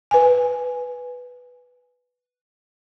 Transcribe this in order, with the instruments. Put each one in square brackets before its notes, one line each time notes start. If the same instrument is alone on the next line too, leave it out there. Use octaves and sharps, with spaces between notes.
[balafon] B4 G#5